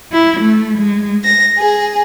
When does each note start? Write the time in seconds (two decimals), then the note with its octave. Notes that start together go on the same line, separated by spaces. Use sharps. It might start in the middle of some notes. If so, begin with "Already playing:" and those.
0.12 E4
0.41 A3
0.77 G#3
1.24 A#6
1.57 G#4